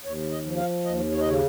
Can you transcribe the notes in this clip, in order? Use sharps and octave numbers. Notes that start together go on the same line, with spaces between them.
D#2 C#5
D#5
F3
F5
D#2 D#5
C#5
D#5
C#3 C#5